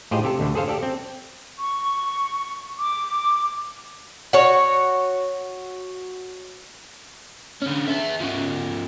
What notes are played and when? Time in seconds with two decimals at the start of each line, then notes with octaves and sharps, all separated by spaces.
0.11 A2 F4 G4 G#4 C5 D#5
0.23 C3 G4 A4
0.40 D2 D3
0.55 G#4 A4 C5 F5
0.68 G4 A4 D5
0.83 C4
1.58 C#6
2.79 D6
4.33 F#4 C#5
7.62 D3 C#4
7.88 G#4 E5
8.20 F3 C#4